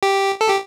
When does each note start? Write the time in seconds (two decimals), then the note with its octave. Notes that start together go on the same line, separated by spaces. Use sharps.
0.03 G4
0.41 A4
0.48 G4